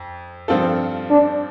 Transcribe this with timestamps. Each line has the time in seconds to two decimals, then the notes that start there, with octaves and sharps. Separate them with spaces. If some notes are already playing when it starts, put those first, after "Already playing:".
Already playing: F2
0.48 G2 F3 C4 F4 A4
1.10 D4